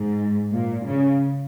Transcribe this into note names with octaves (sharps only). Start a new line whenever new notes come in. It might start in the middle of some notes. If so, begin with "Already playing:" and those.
Already playing: G#2
A#2
C#3